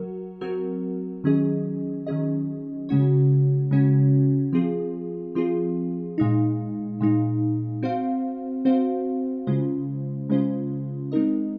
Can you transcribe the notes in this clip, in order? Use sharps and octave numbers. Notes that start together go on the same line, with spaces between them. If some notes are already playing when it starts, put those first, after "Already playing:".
Already playing: F#3 F#4 A#4
F#3 C4 F#4 A#4
D#3 F#3 C#4 G#4 D#5
D#3 F#3 C#4 G#4 D#5
C#3 G#3 C#4 F#4 C#5
C#3 G#3 C#4 F#4 C#5
F3 C4 F4 G#4
F3 C4 F4 G#4
A#2 G#3 D#4
A#2 G#3 D#4
C4 F#4 C5 F5
C4 F#4 C5 F5
C#3 G#3 C#4 F4 C5
C#3 G#3 C#4 F4 C5
G#3 C4 D#4 A#4 D#5